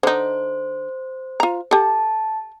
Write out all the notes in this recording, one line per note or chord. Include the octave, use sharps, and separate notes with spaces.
D3 D#4 C5
F4 A#5
G4 A4 A5